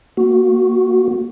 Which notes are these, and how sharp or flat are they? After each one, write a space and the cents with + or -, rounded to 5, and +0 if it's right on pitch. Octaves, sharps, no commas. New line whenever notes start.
A#3 +0 F#4 +0